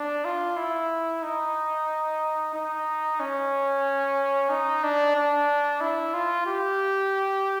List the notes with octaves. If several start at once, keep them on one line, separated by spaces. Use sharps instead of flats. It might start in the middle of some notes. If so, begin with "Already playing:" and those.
Already playing: D4
F4
E4
D#4
D#4
C#4
D#4
D4
D4
E4
F4
G4